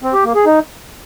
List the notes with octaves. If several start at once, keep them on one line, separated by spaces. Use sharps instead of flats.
C4
G4
A#3
G#4
D#4